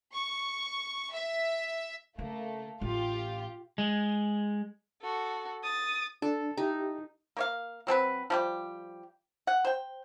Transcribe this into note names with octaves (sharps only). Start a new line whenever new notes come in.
C#6
E5
C#3 A3 A#3
A1 F4 G4
G#3
F#4 A4
D#6 A6
D4 A4
D#4 E4 G4
A#3 C#5 F5
F#3 C4 A4 B4
F3 G3 G4
F#5
C5 G5